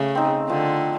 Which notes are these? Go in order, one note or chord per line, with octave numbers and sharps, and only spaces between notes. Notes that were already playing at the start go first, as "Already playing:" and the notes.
Already playing: C#3 A3
C4 D#4
D3 F3